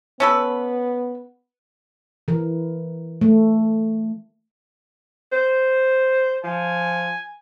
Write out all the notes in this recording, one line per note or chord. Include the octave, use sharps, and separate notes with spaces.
B3 C#4 A4 B4
E3 A#4
A3
C5
F3 G#5